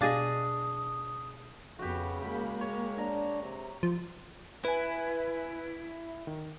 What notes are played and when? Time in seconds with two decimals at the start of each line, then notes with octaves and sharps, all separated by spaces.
0.01 B2 D4 G#4 D#5 F5 D6 D#6 A6
1.79 F2 C#3 B3 F#4 G4
2.22 G#3 A#3 G5 B5
2.61 C#5
2.98 D4 A#5
3.42 C3
3.83 F3
4.65 E4 B4 G#5
6.27 D#3